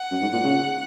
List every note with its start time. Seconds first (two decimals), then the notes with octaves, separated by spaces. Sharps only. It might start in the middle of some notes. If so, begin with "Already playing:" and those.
Already playing: F#5
0.11 F#2
0.22 G#2
0.33 A#2
0.44 C#3